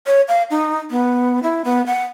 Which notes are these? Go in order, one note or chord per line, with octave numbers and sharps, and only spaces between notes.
C#5
F5
D#4
B3
E4
B3
F#5